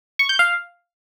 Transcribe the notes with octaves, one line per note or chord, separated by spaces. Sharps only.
C#6
G6
F5